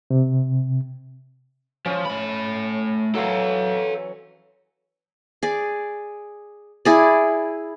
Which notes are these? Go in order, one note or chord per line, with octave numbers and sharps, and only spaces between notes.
C3
F3 C#4
A3 B5
E3 F#3 A4 F5
G#4 D5
E4 G#4 D5